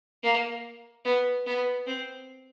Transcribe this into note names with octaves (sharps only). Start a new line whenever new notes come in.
A#3
B3
B3
C4